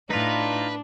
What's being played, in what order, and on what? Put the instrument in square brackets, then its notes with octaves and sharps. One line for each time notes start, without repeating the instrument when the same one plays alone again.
[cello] A2 [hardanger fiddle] D4 [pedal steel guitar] D#4 F4 [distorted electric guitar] B4